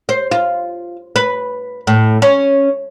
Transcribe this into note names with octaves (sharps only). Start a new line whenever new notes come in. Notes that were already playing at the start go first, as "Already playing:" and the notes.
C5
F4
B4
A2
C#4